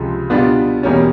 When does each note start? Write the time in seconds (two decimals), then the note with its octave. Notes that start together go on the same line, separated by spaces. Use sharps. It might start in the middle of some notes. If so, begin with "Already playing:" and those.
Already playing: C#2 C3 F3 G#3
0.30 B2 G3 B3 D4 F4
0.83 E2 B2 G3 A#3 C#4